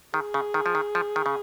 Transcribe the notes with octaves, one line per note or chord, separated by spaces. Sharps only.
D#3 G#4
C#3
D#3
F3
D#3
F3
D#3
C#3